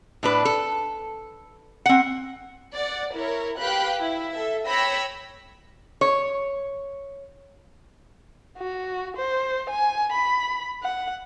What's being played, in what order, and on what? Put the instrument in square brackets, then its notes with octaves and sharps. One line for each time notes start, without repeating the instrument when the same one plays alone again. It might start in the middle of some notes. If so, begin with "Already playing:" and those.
[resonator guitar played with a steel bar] A2 D4 B4
A4
C4 F#5
[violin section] D5 F#5
E4 A#4 C#5
G4 B4 F5 G5 B5 F#6
E4
A4 E5
C#5 G5 B5 E6 A#6
[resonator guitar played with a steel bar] C#5
[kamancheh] F#4
C5
G#5
B5
F#5